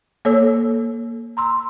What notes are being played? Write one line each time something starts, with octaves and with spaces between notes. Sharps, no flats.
A#3 A4 C#5 E6
A#5 C6 E6